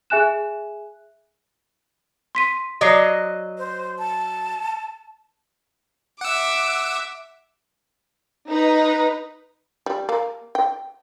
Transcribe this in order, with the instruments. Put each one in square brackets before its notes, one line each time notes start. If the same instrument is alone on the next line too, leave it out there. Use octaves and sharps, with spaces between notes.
[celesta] G#4 E5 G#5 F#6 E7
[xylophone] C6 B6 D#7
[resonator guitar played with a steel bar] F#3 D#5 [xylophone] D5 D6 C7
[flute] C5
A5
[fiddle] E5 D6 [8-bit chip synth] F#5 E6
[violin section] D#4 B4
[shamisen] G3
A#3
G5